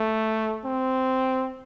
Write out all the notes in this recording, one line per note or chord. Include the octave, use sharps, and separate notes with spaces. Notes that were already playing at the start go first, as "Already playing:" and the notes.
Already playing: A3
C4